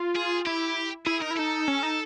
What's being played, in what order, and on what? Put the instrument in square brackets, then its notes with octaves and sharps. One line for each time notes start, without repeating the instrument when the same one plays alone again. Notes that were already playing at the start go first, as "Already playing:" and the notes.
Already playing: [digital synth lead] F4
[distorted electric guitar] G#4
[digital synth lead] E4 [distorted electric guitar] G4
[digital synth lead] E4 [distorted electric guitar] G#4
[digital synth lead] D#4 [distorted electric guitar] A#4
[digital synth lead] E4
[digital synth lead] D#4 [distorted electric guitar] A4
[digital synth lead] C#4
D#4